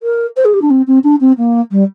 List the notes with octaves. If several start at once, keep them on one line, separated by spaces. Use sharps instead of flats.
A#4
C5
G#4
G4
D4
C4
C4
D4
C4
A#3
G3